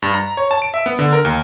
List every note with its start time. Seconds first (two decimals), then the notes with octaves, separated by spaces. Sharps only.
0.02 G2
0.14 A#5
0.37 C#5
0.51 A5
0.62 D7
0.74 E5
0.86 B3
0.99 D3
1.13 A#4
1.25 D#2